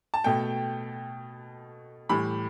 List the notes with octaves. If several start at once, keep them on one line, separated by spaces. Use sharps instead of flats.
A5
B2 A3 G5
A2 E3 G3 B5